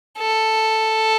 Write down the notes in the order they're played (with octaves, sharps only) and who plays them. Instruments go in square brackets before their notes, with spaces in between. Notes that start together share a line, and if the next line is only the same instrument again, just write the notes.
[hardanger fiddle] A4